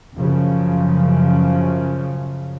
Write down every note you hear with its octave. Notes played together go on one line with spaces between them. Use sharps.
F#2 C#3 F3